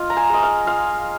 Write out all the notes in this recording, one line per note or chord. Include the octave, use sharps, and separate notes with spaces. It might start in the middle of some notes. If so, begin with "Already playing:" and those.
Already playing: F4 D#5 F5
A#5
G#5
G#3 D#5
F5
F4 F5